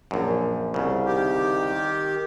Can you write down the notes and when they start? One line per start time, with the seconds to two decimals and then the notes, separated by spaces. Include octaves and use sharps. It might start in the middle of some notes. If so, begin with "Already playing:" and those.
0.11 A#1 F#2
0.74 C2 C#3
1.05 D#3 G4